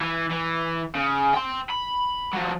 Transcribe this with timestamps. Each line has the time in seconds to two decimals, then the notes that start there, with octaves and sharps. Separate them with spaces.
0.01 E3
0.31 E3
0.95 C#3
1.34 G5 C6
1.70 B5
2.33 F3 F#3